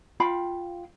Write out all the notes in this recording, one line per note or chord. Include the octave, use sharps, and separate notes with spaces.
F4 F5 G5 B5